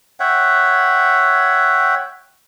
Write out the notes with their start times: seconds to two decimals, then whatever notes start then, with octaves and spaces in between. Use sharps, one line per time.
0.20 C#5 E5 F#5 G5